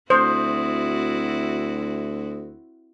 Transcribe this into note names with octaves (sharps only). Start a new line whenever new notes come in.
D2 C4 E4 F#4 C5 D#6